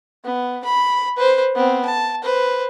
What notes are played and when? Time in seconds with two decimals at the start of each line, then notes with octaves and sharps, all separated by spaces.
0.24 B3
0.64 B5
1.17 B4 C5
1.55 B3 C4
1.85 A5
2.23 B4 C5